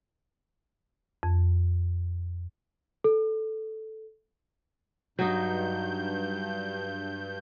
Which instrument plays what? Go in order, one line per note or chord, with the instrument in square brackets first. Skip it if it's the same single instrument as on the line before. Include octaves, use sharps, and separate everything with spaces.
[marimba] F2
[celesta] A4
[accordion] G2 G6 [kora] F#3 D#4